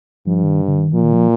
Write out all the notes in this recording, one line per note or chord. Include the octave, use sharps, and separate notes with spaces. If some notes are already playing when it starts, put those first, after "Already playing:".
G2 F3
D#3
D3
D#3
A#2 F3
D#3
F3